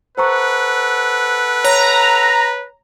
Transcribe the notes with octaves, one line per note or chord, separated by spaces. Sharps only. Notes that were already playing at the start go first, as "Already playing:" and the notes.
A4 B4 C5 F#5 A#5 C#6
C#5 A#5